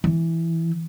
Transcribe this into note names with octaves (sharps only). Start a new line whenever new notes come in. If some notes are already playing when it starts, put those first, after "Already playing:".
E3